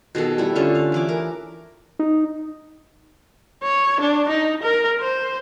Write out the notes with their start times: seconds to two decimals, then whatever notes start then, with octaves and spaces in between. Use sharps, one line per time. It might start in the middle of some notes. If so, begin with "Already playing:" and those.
0.15 B2 D#3 G#4 A4
0.38 G3 A3 E4
0.55 D3 C#4 F4 G4
0.75 F5
0.92 E3 E4 D6
1.09 A#4
1.99 D#4
3.63 C#5
4.01 D4
4.29 D#4
4.63 A#4
5.00 C5